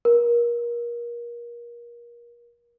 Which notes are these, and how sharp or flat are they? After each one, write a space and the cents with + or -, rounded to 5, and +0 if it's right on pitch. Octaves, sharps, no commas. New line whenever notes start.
A#4 +30